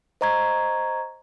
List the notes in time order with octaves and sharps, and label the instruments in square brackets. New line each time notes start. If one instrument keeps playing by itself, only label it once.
[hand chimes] C5 D#5 A#5 C#6 G#6